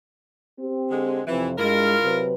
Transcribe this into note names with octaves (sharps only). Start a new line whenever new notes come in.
C4 G4
D3 G#3
F2 C3 E3
G2 G#3 E4 F4 A#4
C3 F#3 B4